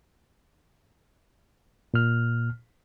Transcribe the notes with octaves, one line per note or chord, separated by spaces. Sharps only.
A#2 F6